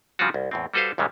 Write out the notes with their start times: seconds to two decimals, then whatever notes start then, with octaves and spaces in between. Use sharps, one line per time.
0.19 C#3 F3 G3 C4 F4 F#4
0.34 C2
0.51 E2 A2 C4
0.74 G3 F#4 A4 B4 C5 F5
0.98 D#2 A#2 C#3 G3 G#3